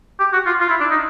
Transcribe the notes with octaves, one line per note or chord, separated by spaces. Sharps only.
G4
F#4
F4
F4
E4
D4
D#4